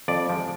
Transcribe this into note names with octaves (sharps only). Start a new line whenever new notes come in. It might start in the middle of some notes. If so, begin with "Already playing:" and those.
F2 D5
C3 F3 G#3